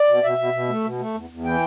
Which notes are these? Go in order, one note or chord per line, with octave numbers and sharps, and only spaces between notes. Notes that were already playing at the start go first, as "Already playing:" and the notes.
Already playing: D5
B2
B2 E5
B2
B2
A3
B2
A3
E2
E2
E3 G5